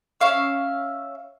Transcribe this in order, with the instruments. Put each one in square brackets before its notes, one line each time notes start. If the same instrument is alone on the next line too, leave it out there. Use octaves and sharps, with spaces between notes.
[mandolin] C#4 E5 F5 E6